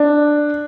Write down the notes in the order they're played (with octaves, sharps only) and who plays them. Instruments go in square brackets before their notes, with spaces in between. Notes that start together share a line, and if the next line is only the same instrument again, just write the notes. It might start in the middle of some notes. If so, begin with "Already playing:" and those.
Already playing: [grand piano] D4